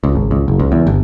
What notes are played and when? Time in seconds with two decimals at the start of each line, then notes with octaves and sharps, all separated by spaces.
0.04 C#2
0.15 G#1
0.31 C#2
0.48 F#1
0.60 C#2
0.72 E2
0.87 G1